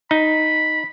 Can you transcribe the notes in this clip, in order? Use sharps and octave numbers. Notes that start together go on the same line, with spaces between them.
D#4 B5